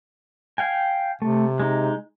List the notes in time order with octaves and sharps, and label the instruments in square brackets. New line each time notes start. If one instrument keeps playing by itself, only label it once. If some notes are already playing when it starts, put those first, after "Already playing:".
[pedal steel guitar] F5 G5 G#5
[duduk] C3 [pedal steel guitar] A3
[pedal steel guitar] G#3 D#4